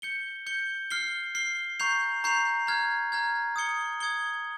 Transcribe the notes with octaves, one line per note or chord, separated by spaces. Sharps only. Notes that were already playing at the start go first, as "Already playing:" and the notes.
G6 C#7 G7
G6 C#7 G7
F6 C7 G7
F6 C7 G7
A#5 C#6 G6 C7 F7
A#5 C#6 G6 C7 F7
A#5 F6 G#6
A#5 F6 G#6
D#6 G#6 C#7 G7
D#6 G#6 C#7 G7